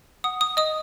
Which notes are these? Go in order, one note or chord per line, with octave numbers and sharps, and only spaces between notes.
F#5 D#6
D#6
D#5 D#6